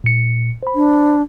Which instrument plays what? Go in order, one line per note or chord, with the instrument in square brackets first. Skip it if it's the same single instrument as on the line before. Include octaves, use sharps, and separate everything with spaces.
[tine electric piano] A#2 C#7
C5 B5
[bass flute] D4